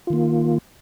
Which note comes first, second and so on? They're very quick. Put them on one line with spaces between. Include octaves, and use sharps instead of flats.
F4 D#3 A#3